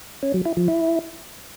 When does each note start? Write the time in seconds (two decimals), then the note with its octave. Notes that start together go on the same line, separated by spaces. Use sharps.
0.23 C#4
0.34 F#3
0.45 E4
0.57 F3
0.68 E4